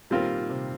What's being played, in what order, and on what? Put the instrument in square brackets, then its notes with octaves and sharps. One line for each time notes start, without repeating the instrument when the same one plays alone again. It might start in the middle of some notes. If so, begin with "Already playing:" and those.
[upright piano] A#2 D#3 [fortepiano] G3 C4 F4 A#4
[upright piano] A#2
C3